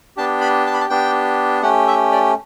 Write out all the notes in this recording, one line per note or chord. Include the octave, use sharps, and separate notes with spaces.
B3 D4 G4 A5
B5
A5
B5
A5
B3 D4 G4 G5
A3 C#4 G4 F#5
E5
D5